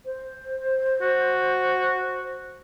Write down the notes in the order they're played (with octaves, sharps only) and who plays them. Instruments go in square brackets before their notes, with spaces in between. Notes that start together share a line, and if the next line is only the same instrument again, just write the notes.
[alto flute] C5
[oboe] F#4